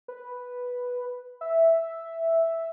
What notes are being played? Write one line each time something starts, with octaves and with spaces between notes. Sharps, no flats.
B4
E5